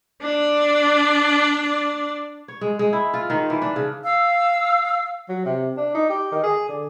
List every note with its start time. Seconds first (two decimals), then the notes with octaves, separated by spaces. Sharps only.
0.22 D4 D5
2.48 C#5
2.61 G#3
2.79 G#3
2.93 E4
3.14 F4
3.30 D#3
3.50 E3
3.62 D4
3.76 C#3
4.03 F5 E6
5.29 F#3
5.45 C3
5.77 D4
5.95 D#4
6.10 G4
6.32 D#3
6.43 G#4
6.69 D3